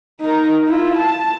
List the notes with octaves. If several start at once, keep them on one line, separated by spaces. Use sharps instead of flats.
D#4 A#4
E4 F4
A5